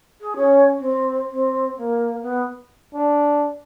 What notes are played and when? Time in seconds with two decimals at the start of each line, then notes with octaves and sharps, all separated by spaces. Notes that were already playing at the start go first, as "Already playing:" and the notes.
0.20 G#4
0.35 C#4
0.79 C4
1.30 C4
1.77 A#3
2.22 B3
2.94 D4